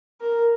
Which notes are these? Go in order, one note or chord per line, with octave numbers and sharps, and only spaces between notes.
A#4